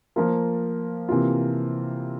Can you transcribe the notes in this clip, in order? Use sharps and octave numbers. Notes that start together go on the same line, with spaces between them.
F3 A#3 F4 A#4
C3 E3 A#3 F4